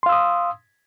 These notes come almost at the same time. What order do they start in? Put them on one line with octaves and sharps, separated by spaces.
C6 F5 E6 D#6